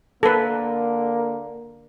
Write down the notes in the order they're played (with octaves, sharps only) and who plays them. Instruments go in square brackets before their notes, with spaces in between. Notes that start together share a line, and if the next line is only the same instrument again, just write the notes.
[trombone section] D3 A#3 [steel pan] A4 B4